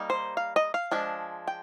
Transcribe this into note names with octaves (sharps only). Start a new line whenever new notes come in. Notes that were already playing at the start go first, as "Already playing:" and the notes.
Already playing: G3 A#3 D#4
C5
F5
D#5
F5
F3 G#3 D4
G5